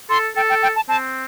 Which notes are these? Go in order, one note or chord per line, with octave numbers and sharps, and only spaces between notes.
A4 C6
A4 G5
G5
G5
A5
C4 A5